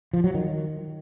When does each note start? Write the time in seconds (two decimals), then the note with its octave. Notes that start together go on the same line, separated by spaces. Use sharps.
0.13 F3
0.24 F#3
0.34 D#3